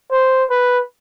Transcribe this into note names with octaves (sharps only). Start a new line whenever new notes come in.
C5
B4